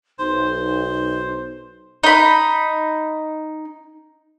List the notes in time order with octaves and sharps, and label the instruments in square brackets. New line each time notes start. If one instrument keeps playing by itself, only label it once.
[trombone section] B1 [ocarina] D#4 [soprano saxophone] C5
[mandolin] D#4 B5